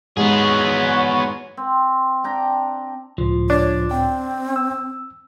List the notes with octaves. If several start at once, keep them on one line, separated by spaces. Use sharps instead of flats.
G#2 G#3 B3 F#4 G#4 C#5
C4
D4 G5 A#5
C#2 A2 F3
D4 C#5
C4 G5
E6